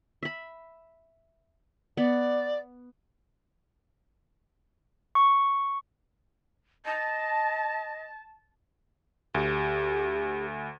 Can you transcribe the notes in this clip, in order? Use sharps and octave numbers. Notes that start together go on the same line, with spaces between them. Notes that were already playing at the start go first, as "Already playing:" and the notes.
E5 B5
B3 D5
C#6
D#5 A5
D2 G4